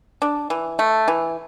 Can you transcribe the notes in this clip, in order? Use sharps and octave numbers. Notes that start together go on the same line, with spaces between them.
D4
E3
A3
E3